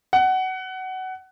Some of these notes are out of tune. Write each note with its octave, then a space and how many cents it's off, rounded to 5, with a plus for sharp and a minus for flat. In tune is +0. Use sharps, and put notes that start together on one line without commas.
F#5 +20